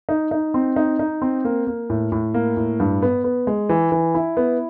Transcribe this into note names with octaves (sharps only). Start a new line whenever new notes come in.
D#4
D#4
C4
D#4
D#4
C4
A#3
A#3
A2
A2
A#3
A2
G2
B3
B3
G#3
E3
E3
E4
B3